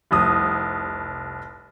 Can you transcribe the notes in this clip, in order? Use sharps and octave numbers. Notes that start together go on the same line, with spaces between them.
F1 C2 D#6